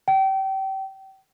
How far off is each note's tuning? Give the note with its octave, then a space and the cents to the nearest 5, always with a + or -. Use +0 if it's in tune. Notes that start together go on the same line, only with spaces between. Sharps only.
G5 -30